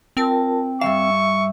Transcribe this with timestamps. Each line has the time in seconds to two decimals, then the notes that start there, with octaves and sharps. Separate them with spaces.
0.17 C4 F4 A#4 A5
0.81 G2 D#3 E5 F5 C#6 E6